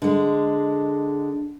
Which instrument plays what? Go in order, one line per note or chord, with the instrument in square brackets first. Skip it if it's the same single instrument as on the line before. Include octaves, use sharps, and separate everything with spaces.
[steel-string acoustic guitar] D3 G#3